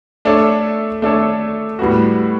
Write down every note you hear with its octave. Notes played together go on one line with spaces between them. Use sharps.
A3 D4 A4 C#5
A3 D4 A4 C#5
A2 G3 B3 F#4